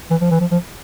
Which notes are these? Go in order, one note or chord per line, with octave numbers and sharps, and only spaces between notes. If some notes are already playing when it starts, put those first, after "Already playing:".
E3
F3
E3
F3
F3